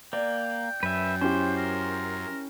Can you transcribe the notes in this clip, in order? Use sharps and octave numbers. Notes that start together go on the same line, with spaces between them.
A#3 D5 G5
F#2 B4 E5
C#4 E4 G4 C5
A#4